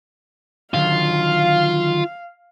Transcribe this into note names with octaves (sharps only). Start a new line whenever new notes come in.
D3 D#3 F#3 F4 F5